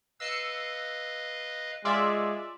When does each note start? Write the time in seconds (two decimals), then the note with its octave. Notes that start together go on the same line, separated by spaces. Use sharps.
0.20 B4 D#5 F5 E6 C7 C#7
1.85 G#3 F4 D5 E5